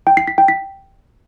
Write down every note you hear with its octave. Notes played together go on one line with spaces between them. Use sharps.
G5
C7
B6
G5
B6